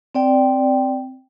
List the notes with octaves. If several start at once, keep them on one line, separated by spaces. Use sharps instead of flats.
C4 D5 G5